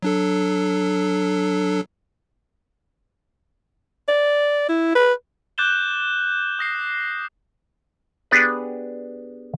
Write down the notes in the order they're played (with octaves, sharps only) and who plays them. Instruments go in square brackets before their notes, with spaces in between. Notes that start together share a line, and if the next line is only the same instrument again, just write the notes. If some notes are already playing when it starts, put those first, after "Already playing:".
[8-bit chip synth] F#3 D4 A4
[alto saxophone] D5
E4
B4
[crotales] D6 F#6 G6 A6 E7 G7
D#6 A#6 C7
[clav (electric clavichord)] B3 D4 G4 G#4 B4